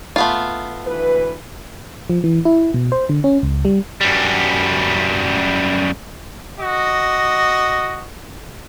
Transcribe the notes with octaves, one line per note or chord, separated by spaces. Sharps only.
A3 B3 F4
D2 E3 B4
F3
E3
E4
B2
C5
D3
C#4
C#2
G3
F#2 G3
F#4 D#5